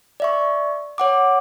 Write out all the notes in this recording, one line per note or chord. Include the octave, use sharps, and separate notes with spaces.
D5 E5 C#6
C#5 F#5 D6